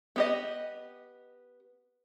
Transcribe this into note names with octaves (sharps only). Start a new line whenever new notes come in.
B3 G4 D#5